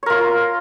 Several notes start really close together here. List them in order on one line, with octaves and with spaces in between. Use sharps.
C#5 A#4 F4